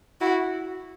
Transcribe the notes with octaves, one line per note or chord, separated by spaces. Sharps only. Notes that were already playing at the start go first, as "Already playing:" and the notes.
E4 F#4